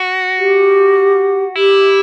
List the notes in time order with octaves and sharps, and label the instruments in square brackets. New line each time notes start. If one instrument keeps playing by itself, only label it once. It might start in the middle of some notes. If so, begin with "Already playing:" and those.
Already playing: [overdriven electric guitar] F#4
[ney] G4
[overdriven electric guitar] E4 [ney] G4